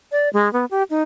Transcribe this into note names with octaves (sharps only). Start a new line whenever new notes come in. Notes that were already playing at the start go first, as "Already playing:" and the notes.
D5
G#3
B3
G4
D#4